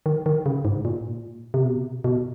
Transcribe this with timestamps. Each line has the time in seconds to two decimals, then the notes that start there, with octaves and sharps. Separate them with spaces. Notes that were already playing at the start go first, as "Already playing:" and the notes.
0.06 D#3
0.26 D#3
0.46 C#3
0.65 G#2
0.85 A#2
1.54 C3
1.65 B2
2.04 B2